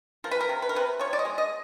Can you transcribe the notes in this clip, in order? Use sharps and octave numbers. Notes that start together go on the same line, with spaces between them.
F3 A#4
B4
A#4
C3
B4
A#4
C3 B4
F3 C#5
D5
D#5
G#3
D#5